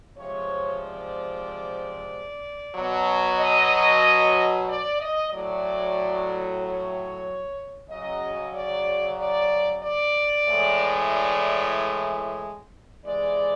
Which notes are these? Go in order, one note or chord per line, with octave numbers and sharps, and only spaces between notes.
C3 F3 G#3 C#5
D5
B2 F#3
D#5
D5
D#5
A2 F#3 D5
C#5
C#3 F#3 D#5
D5
D5
D5
A2 E3 G#3
D5
C3 E3 G#3 D5